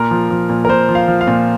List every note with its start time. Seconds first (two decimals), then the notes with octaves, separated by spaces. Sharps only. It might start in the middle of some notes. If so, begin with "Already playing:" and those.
Already playing: A#2 A#4
0.11 F3
0.30 F3
0.50 A#2
0.65 A#4
0.69 A#2 C5
0.89 F3
0.95 F5
1.08 F3
1.21 F5
1.28 A#2